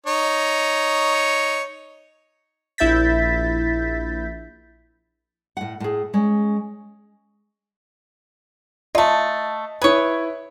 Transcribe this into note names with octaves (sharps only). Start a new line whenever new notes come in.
D#4 C#5
A#1 E4 E5 G6 A6 B6
A2 F#5
A2 G#4
G#3 C#4
A3 F4 D#5 A5
E4 G#4 B4 C#5